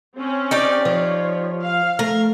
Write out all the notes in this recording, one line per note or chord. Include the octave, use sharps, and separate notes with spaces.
C4 C#4
D#4 G4 D5
F3 C#5
F5
A3 A#4